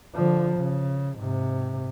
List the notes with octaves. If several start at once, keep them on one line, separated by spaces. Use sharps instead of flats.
D3 F3
C#3
G#2 C3